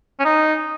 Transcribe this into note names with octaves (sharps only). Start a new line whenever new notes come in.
C#4
D#4